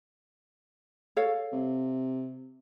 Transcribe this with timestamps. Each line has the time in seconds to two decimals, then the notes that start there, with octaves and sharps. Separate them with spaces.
1.16 A4 C#5 F5
1.52 C3